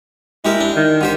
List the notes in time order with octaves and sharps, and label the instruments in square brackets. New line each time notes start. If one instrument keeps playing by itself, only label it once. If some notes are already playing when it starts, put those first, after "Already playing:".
[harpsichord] G#3 G4 A#4 [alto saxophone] E4
[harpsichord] D4
[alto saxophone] D#3
[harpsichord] D3 G4 C5